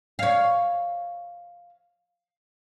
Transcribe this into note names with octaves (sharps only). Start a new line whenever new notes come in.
C#5 F5